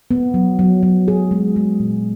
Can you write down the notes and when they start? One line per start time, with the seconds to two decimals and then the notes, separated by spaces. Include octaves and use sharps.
0.11 B3
0.34 F#3
0.59 F#3
0.83 F#3
1.08 G#4
1.31 G#3
1.56 G#3
1.80 A#2